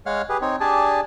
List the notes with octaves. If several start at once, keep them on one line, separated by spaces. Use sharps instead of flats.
G#3 C#5 F5 F#5 F6
G4 G#4 B4
C4 D#4 C#5
D4 G4 G#4 D5 G#5 A5